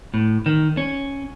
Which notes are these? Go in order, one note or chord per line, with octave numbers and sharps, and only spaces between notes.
A2
D#3
C#4